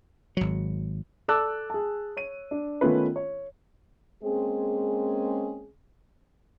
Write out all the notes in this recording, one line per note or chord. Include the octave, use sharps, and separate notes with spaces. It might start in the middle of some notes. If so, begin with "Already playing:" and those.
G#1 F#3
A4 D5 A5 D6 E6 F#6
G#4 A5
C#5 D#7
D4
D#3 A3 B3 C#4 F4 B4
C#5
G#3 A#3 C4 C#4 G#4